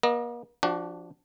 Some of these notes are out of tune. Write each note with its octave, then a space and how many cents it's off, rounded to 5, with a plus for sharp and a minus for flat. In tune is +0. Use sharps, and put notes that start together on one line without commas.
A#3 +40 D#5 +0
F3 +0 D4 +0 F#4 +35